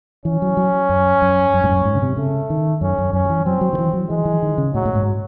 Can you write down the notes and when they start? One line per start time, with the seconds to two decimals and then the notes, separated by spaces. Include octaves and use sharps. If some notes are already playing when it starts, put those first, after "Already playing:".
0.25 E3 C#4
0.42 F#3
0.57 F#3
0.89 F#2
1.22 F#2
1.54 F#2
1.64 G#2
1.69 F#2
1.85 G#2
1.95 C#3
2.02 C3
2.17 C#3 A3
2.50 D#3
2.81 F#2 C#4
2.98 F#2
3.13 F#2 C#4
3.25 F#3
3.30 E3
3.45 F#3 C4
3.61 F#3
3.73 D#3
3.78 E3
3.93 F#3
4.10 E3 G#3
4.25 E3
4.42 D#3
4.58 C#3
4.74 A2 F#3
4.85 A2
4.95 G#2